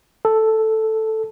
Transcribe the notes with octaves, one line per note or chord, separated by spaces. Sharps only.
A4